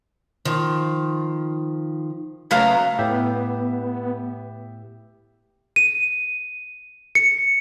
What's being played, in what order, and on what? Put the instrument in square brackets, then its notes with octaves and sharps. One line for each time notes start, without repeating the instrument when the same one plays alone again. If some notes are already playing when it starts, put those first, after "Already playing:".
[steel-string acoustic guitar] D#3 F3
[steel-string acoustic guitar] C#3 F#3 A3 [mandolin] B3 F5 A#5
[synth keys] A2 G4 E5 [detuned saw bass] B3
[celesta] D#7
C#7